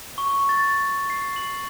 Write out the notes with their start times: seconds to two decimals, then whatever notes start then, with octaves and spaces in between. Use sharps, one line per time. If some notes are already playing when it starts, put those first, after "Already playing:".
0.18 C#6
0.49 A6
1.10 C7
1.36 F#7